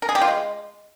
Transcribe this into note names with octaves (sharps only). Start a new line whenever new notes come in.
A#4
G#4
G4
F4
G#3